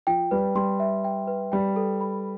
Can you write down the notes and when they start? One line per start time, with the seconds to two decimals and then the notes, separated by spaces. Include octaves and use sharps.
0.07 F3 G5
0.31 G3 B4
0.55 G3 C6
0.80 E5
1.04 G5
1.27 B4
1.52 G3 G5
1.76 A4
2.01 B5